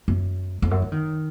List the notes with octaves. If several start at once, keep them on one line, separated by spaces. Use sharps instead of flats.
F#2
F2
F#2
F3
D#3